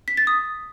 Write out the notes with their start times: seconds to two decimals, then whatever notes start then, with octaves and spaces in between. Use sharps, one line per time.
0.08 B6
0.17 A6
0.27 D#6